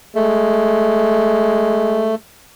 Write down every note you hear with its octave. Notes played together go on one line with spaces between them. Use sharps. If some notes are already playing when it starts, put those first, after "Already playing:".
G#3 A3